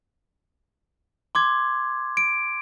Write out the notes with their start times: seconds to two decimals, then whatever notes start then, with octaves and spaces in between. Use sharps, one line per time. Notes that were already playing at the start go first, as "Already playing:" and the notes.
1.35 C6 D6 G#6
2.17 D7